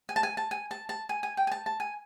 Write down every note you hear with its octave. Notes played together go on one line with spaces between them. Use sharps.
G#5
A5
G#5
A5
G#5
A5
A5
G#5
G#5
G5
G#5
A5
A5
G#5